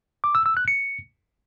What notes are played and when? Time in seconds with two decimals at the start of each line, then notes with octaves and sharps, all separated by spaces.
0.24 D6
0.35 E6
0.46 E6
0.57 F#6
0.68 C#7